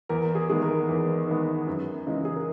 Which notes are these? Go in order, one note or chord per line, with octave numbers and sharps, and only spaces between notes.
E2 A#4
G#4
D#3 G#3 B3 G#4
A#4
E2
D#3 G#3 B3
F#2
C#3 E3 G#3 D#4
G#4
A#4